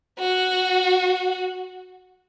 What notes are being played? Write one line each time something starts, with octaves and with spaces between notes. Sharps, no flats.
F#4